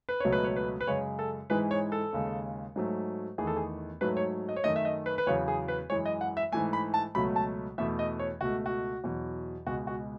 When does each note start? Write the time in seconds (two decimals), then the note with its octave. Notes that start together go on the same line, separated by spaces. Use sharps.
0.09 B4
0.20 C#2 B2 F#3 A3 C#5
0.32 B4
0.44 C#5
0.56 B4
0.81 B4
0.87 F#2 C#3 G#3 C#5
1.19 A4
1.50 G#2 E3 G#3 B4
1.71 C#5
1.92 A4
2.13 D#2 C#3 G#3
2.76 G#2 F#3 A3
3.38 E2 D#3 A3 G#4
3.47 A4
3.56 G#4
4.01 G#2 F#3 A3 B4
4.17 C#5
4.49 D#5
4.56 C#5
4.64 F#2 D#3 A3 D#5
4.76 E5
4.85 D#5
5.06 B4
5.18 B4
5.27 E2 C#3 F#3 C#5
5.48 G#4
5.68 B4
5.90 F#2 E3 G#3 C#5
6.05 D#5
6.21 F#5
6.37 E5
6.52 G#2 E3 A3 G#5
6.73 B5
6.94 A5
7.15 C#2 B2 F#3 A3 B5
7.36 A5
7.78 E2 B2 A3 E5
7.99 D#5
8.19 C#5
8.41 C#2 B2 A3 F#4
8.66 F#4
9.04 E2 B2 F#3
9.67 C#2 B2 G#3 F#4
9.87 F#4